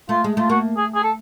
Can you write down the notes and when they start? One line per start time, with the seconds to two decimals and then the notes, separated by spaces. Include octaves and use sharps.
0.09 A3 F4
0.24 G#3
0.37 A3 F4
0.50 A#3 F#4
0.77 G#4
0.95 G#4
1.03 A4